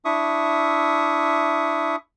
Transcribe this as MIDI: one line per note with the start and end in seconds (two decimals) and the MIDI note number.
0.05 1.96 62
0.05 1.96 64
0.05 1.96 76
0.05 1.96 85
0.05 1.96 87